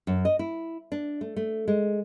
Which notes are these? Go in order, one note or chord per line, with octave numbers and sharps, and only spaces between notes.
F#2
D#5
E4
D4
A3
A3
G#3